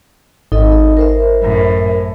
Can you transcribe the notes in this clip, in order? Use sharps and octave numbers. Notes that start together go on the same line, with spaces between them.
G#1 D#4 A4 D#5
A#4 C5 E5
F#2 A2